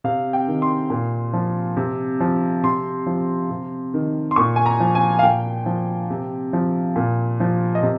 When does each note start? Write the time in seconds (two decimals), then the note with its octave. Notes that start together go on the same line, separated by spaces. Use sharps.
0.04 C3 F5
0.33 G5
0.48 D#3
0.62 C6
0.90 A#2
1.33 F3
1.77 C3
2.20 F3
2.63 C3 C6
3.07 F3
3.51 C3
3.94 D#3
4.31 C6
4.36 A#2 C#6
4.56 G#5
4.66 A#5
4.80 F3
4.95 G#5
5.19 F5
5.23 A#2 G5
5.66 F3
6.10 C3
6.53 F3
6.96 A#2
7.40 F3
7.75 D#5
7.83 C3